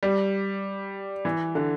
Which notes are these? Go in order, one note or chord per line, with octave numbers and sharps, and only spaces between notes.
G3
E3
D3